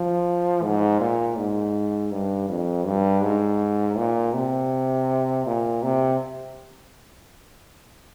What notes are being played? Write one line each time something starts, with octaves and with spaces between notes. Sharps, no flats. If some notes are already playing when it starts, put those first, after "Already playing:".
Already playing: F3
G#2
A#2
G#2
G2
F2
G2
G#2
A#2
C3
A#2
C3